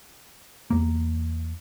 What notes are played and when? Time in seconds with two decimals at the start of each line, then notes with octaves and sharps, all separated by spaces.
0.70 E2 A#3